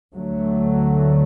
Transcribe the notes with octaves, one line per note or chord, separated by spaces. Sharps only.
D2 D3 F#3 A3